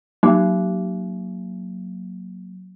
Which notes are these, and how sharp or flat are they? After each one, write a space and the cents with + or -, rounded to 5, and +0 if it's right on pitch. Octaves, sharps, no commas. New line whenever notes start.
F#3 +0 A#3 +0